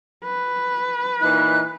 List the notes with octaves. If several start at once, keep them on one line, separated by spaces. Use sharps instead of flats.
B4
A#2 E3 D#4 F#6